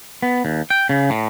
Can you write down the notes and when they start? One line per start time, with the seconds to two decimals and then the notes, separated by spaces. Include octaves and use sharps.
0.23 B3
0.45 D#2
0.70 G5
0.89 C#3
1.10 A2